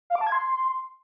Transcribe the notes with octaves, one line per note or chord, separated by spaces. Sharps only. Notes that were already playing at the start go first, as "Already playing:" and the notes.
F5
D6
A5
G#6
C6